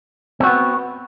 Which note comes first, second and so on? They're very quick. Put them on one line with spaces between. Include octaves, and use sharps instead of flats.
C4 F#4 B3